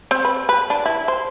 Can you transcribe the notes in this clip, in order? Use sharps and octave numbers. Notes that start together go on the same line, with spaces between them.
C4
B4
B4
D4
E4
C5